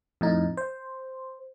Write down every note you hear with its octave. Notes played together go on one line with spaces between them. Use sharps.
F2 A2 D#4
C5